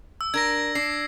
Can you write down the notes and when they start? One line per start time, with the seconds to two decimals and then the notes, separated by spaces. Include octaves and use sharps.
0.21 E6
0.34 D4 A#4 G#6 A#6
0.75 D4 C7